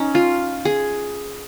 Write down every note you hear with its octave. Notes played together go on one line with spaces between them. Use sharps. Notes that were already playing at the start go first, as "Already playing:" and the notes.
Already playing: C#4 D#4
F4
G#4